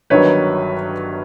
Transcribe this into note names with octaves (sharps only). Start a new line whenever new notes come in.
G1 G2 D#3 F#3 B4 C#5